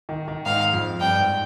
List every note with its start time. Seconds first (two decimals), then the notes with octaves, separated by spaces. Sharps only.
0.09 D#3
0.28 D#3
0.46 G#2 F5
0.73 F2
1.00 G2 G5
1.19 G#2